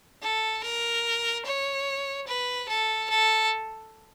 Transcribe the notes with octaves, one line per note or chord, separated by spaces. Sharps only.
A4
A#4
C#5
B4
A4
A4